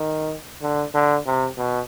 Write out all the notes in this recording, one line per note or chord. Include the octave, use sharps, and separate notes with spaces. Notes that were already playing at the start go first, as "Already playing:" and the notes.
Already playing: D#3
D3
D3
C3
B2